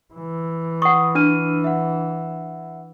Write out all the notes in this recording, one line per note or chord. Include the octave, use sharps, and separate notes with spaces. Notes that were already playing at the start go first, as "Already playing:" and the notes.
E3
F#5 C#6 D#6
D4 F6 D#7
E5 F#5